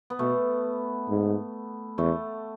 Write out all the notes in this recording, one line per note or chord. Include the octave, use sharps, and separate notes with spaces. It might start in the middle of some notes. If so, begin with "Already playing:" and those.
B3
B2 A3
G#2
E2 A3